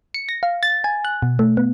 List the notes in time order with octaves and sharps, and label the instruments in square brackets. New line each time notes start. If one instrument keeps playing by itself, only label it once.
[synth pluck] C#7
A#6
F5
A6
G#5
F#6
B2
A3
B3